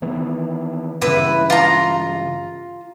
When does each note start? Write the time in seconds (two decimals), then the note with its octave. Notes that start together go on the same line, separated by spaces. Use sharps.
0.02 D#3 E3 B3
1.01 G2 C#3 E3 E4 B4
1.50 F4 A#5